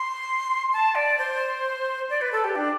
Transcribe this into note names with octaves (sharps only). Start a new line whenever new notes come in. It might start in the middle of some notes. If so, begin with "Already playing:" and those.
Already playing: C6
A5
D5
C5
D5
B4
A4
G4
D4